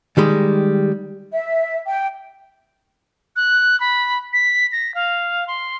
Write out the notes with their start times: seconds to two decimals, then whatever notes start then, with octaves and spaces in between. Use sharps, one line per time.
0.17 D#3 G3 G#3
1.33 E5
1.87 G5
3.36 F#6
3.80 B5
4.33 B6
4.72 A#6
4.95 F5
5.48 C6